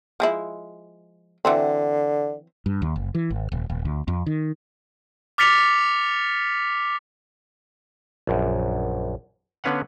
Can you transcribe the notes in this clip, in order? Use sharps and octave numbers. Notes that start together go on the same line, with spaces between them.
F3 G#3 E4
D3 E3 F#3 C4
G2
D#2
F#1
E3
G#1
D#1
D#1
D2
F2
D#3
D6 F6 A6 B6 C#7 F7
A#1 F#2
D3 B3 C#4 B4 F5 F#5